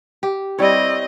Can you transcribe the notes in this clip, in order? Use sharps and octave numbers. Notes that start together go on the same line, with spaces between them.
G4
G3 C4 E4 C#5 D#5